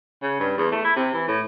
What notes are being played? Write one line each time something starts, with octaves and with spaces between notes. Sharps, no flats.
C#3
G2
E2
A3
E4
C3
E3
A2